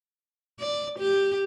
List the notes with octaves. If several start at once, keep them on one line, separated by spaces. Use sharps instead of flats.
D5
G4